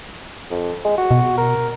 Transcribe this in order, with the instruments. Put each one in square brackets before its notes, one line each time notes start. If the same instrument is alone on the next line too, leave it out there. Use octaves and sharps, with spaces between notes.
[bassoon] F2
G#3
F#4
[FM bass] B2
[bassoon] A#4